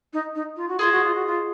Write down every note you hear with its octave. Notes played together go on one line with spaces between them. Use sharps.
D#4
D#4
F4
F#4
F4 G#4 C5 D#5
F#4
F4
F#4
F4